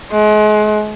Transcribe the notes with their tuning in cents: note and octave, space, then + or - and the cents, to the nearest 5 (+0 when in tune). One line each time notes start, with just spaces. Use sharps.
G#3 +35